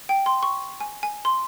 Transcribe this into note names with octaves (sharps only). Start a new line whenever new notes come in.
G5
C6
C#6
G#5
G#5
C6